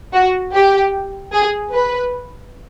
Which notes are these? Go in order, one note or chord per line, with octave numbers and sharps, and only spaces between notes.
F#4
G4
G#4
B4